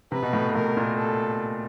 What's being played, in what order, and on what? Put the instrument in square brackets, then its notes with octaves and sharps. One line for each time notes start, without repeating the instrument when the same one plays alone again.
[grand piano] C3 [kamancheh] B4
[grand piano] B2
A2
[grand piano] A2 [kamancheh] A#4
[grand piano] A#2
[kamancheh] A4